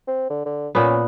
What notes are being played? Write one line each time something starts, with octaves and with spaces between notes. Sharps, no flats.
C4
D3
D3
A#2 B3 C#4